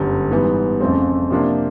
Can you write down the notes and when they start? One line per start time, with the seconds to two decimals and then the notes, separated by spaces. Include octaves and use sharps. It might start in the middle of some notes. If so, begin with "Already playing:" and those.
Already playing: G1 F#2 D3 G3
0.31 G#2 E3 G3 B3
0.80 F2 C#3 F3 A3 C4
1.30 C3 F3 A#3 D4